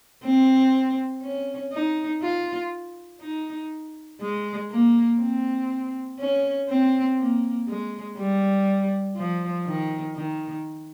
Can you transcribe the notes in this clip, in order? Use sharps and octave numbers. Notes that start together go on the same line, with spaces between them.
C4
C#4
D#4
F4
D#4
G#3
A#3
C4
C#4
C4
A#3
G#3
G3
F3
D#3
D#3